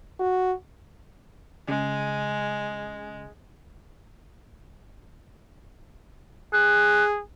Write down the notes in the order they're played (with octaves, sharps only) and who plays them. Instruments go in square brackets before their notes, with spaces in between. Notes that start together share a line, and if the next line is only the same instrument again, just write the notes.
[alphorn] F#4
[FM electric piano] C#3 [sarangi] G#3
[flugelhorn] G#4 [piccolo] F#6